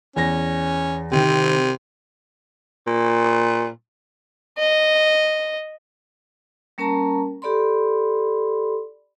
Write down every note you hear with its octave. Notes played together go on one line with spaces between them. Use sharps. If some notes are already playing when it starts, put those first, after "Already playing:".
E2 C#4 A#6
C3 D#3 C4
A#2
D#5
G3 A#3 C#4 A#4 A5 A#5
G4 A4 D5 B5 C6